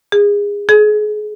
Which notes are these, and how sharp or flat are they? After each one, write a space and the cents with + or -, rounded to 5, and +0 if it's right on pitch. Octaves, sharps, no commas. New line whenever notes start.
G#4 -25
G#4 +30